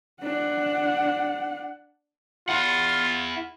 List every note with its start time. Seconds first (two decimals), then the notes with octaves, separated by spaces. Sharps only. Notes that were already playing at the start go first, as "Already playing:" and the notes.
0.22 D4 F#5
2.49 E4 F4 F#5